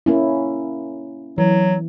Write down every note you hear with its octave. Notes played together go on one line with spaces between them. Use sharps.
A#3 C#4 E4
E3 F#3